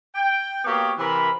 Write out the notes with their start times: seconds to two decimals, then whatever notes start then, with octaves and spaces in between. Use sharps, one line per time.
0.15 G5
0.65 A#3 B3 F#4 G4 C#5
0.98 C3 E3 A#4 B5